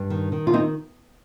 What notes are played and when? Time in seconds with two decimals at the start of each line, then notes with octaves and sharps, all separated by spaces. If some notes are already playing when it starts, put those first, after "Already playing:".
Already playing: G2
0.10 D#3
0.32 D#3
0.47 F4
0.54 C4 D#4